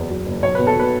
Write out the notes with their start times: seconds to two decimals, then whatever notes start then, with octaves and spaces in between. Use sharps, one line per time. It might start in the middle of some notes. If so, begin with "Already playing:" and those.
Already playing: F#1 E2 F#3
0.10 F#3
0.26 F#1
0.43 B1 C#5
0.55 B2 B4
0.67 A4
0.76 B2 B4